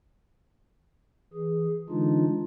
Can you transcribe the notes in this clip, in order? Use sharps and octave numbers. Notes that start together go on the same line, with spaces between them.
E3 G#4
D3 E3 G#3 D4 D#4 F4